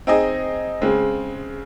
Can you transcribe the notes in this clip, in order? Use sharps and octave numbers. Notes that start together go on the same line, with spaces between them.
C4 D#4 G#4 D#5
C#3 G#3 C4